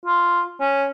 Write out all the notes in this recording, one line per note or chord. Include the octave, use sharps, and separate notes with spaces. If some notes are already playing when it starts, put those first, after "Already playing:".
F4
C#4